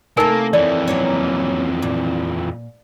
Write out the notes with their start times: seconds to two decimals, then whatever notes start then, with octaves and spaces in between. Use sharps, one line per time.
0.17 C3 A3 A#3 D#4 A#4 G#5
0.53 F2 E3 C#5 D5
0.88 F#3 A#3 C#4
1.82 A#2